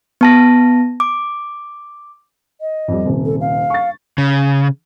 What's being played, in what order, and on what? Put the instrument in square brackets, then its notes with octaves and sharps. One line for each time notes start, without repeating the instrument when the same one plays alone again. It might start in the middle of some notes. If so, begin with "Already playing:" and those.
[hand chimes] B3 A5 A#6
D6
[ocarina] D#5
[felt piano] F2 G3
D#1 C3
[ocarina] A4
F5
[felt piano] C#6 A6
[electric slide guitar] C#3